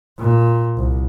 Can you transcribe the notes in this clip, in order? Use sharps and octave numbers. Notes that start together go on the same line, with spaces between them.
A#2
C2